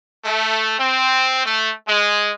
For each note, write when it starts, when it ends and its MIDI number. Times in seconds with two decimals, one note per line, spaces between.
0.25 0.75 57
0.79 1.44 60
1.46 1.72 57
1.88 2.31 56